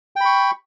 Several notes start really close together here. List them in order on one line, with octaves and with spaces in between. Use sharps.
G5 B5 C#6